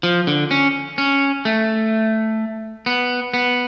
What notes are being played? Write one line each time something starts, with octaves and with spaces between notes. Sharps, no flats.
F3
D3
C#4
C#4
A3
B3
B3